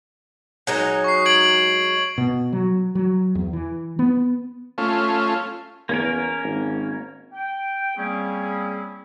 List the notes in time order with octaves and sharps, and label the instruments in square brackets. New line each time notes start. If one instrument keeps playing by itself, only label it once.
[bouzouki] F#3 G#3 D#4
[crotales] C#6 C7
G#6 D7 F#7
[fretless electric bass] B2
F#3
F#3
E2
E3
B3
[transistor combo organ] A3 C#4 F4
[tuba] E2 [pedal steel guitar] A#3 C#4 A#4
[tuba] G#1
[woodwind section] G5
G3 A#3 C4 C#4 E4 G#4